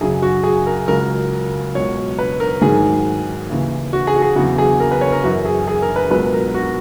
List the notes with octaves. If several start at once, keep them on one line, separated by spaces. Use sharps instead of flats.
F#2 C#3 F#3 G#4
F#4
G#4
A#4
C#2 C#3 F#3 A#4
C#2 B2 F#3 C#5
B4
A#4
G#2 D#3 F#3 G#4
D#2 C#3 E3
F#4
G#4
F#4
G#4
E2 C#3 F#3 F#4
G#4
A#4
B4
C#5
A#4
F#2 E3 F#4
G#4
G#4
A#4
B4
C#2 B2 F#3 B4
A#4
F#4